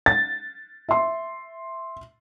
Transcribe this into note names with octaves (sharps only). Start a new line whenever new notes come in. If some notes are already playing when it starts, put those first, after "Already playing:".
A6
E5 C6